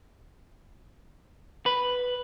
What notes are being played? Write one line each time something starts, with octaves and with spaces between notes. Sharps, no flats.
B4